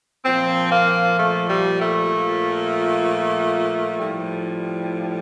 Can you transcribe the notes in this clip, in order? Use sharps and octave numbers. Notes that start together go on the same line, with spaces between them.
A#2 F3 C4
A#3
A3
G3
A3
A#2 F3
A2 F3 G3